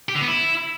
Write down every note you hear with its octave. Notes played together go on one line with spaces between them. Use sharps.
G4
D3
B3
E4